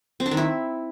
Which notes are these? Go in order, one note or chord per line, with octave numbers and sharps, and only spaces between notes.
C4
D4
D#3
E4